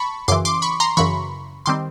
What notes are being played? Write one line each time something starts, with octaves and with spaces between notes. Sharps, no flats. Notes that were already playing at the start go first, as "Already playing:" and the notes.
Already playing: A5 B5 C#6
F#2 C#3 E3 C6 D6
C6 D6
B5 C#6
A#5 C6
F#2 C#3 E3 B5 C#6
D#3 G3 C4 C6 D6